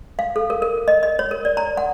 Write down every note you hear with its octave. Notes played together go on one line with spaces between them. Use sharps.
F5
A4
A#4
A#4
D#5
D#5
C#5
A#4
D5
A#5
F#5